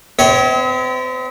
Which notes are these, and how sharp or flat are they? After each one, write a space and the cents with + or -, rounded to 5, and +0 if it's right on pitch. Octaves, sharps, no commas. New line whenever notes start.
C4 -40 C#5 +0 E5 -40